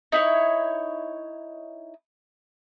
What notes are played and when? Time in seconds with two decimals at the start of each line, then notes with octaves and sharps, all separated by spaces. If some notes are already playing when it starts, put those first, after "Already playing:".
0.12 D#4 E4 C#5